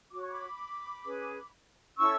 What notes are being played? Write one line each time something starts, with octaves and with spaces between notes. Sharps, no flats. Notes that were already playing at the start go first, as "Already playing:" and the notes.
F#4 C#5 D6
C#6
B5 D6
C#4 G#4 B4
C#4 E4 A4 C#5 C#6 E6